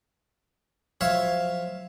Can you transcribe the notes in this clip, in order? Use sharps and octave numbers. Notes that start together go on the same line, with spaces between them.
F3 F#3 C5 C#5 E5 F5